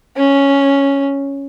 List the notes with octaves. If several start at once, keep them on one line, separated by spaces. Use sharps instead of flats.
C#4